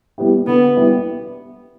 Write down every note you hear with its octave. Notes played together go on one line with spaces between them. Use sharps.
G3 B3 E4 G4
D3 B3
G3 B3 E4 G4